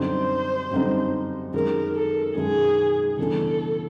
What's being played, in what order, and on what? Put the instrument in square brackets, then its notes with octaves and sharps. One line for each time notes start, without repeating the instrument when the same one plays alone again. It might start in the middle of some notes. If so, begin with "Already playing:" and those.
Already playing: [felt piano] F#2 D3 G3 C4 D#4 [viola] C5
[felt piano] F#2 D3 G3 C4 D#4
[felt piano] F#2 D#3 G#3 [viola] A#4
[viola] A4
[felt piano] F#2 D#3 G#3 [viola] G#4
[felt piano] C#3 E3 G3 B3 D4 [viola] A4